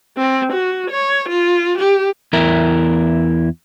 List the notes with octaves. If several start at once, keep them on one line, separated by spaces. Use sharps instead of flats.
C4
F#4
C#5
F4
G4
E2 E4 A#4